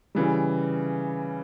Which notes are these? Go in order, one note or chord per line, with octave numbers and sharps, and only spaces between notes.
C#3 E3 G3